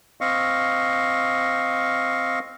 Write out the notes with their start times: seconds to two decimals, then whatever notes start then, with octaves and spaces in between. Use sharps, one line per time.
0.21 C4 D#5 F5 C#6